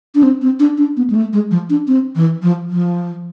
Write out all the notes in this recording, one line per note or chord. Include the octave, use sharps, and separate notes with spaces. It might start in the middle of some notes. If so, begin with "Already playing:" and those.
D4
C4
C4
D4
D4
B3
G#3
A3
G#3
F3
D4
C4
E3
F3
F3